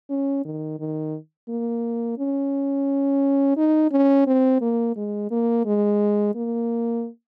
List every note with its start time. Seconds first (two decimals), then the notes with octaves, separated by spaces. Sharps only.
0.10 C#4
0.45 D#3
0.80 D#3
1.49 A#3
2.18 C#4
3.57 D#4
3.92 C#4
4.27 C4
4.61 A#3
4.97 G#3
5.31 A#3
5.66 G#3
6.35 A#3